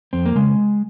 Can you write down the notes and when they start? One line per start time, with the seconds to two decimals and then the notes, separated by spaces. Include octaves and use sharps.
0.13 F2 C4
0.26 A#3
0.36 C#3 G#3